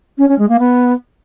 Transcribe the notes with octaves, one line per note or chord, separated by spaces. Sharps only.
C#4
C#4
G#3
A#3
B3